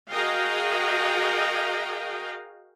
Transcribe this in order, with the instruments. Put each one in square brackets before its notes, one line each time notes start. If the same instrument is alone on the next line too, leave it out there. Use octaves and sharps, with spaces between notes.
[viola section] F#4 G#4 A#4 D#5 F5 G5